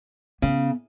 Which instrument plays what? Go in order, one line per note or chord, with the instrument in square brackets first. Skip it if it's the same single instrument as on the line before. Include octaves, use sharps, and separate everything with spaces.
[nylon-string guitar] C#3 [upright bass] B3